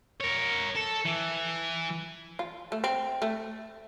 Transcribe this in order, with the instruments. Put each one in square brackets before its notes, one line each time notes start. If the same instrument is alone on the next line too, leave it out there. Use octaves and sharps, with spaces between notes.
[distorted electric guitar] A#4 C#5
A4
E3
[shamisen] F4
A3
C4
A3